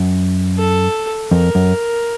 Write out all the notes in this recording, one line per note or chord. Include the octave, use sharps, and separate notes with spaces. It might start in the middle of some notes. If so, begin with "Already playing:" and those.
Already playing: F#2
A4
F2 A#4
F#2